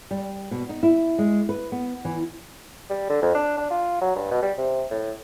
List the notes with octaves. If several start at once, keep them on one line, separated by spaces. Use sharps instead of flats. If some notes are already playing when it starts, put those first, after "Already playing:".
G3
B2
D#4
E4
G#3
B4
B3
E3
G3
D3
F2
D4
D4
F4
F#3
G2
B2
G3
C3
A2